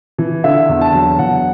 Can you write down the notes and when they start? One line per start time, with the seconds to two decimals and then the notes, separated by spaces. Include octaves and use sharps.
0.18 E3
0.44 D3 E5
0.69 E2
0.81 A5
0.94 F#3
1.19 E2 F#5